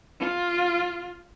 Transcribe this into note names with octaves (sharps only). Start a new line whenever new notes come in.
F4